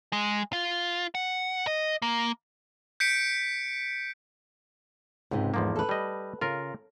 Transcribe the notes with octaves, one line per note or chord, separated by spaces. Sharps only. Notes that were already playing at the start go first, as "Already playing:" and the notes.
G#3
F4
F#5
D#5
A#3
G6 B6 C#7 D7
C#2 G#2 C3
E2 G#2 F3 A3 A#3
A4 B4
G3 D#5
C#3 F4 A#4